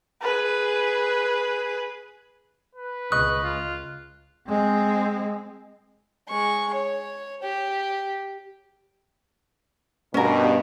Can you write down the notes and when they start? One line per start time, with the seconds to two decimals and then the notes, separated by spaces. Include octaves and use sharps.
0.22 G#4 B4
2.75 B4
3.12 C#2 D#5 C#6 D#6 F#6
3.44 F4
4.47 G#3 C4
6.29 G#3 C#6
6.74 C#5
7.43 G4
10.14 G2 B2 C#4 A#4